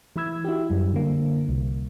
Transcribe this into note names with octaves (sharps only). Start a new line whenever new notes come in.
E3 E4 B5 E6 G#6
E4 F#4 G4
F#2 G3
D3 A#3
C2